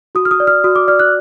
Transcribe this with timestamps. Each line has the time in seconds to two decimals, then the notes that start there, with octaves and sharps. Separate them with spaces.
0.15 F#4 D#6
0.25 F6
0.31 D#6
0.40 D5
0.47 F6
0.64 F#4 D#6
0.76 D6
0.88 D5 F6
1.00 F#6